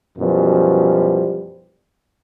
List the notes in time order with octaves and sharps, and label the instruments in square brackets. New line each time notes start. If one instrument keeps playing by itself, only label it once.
[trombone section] F#2 B2 E3 F3 G3